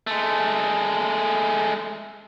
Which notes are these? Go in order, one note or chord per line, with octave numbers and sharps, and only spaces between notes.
G#3 A3